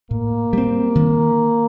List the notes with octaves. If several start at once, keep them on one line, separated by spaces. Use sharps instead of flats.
A2 A#3
G3 C4
D#3